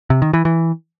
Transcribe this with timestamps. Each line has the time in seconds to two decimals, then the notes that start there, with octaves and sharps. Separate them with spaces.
0.10 C3
0.22 D#3
0.33 E3
0.45 E3